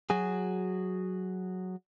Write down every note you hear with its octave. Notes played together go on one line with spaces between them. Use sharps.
F#3 F#4 G#4